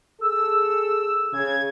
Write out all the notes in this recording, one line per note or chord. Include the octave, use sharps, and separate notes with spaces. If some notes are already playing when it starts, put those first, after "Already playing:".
G#4 A4 E6
C#3 G#6